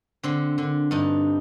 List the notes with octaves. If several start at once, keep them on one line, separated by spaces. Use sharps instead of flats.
D3 C4
D3
G2 D#4